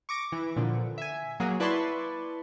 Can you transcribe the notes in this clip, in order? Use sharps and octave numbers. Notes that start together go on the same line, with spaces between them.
C#6 D6 A#6 D7
E3
A#2 D3 F3
E5 G#5
F#3 A#3 F#4 G#4
E4 B4 D5 A5 C6 C#6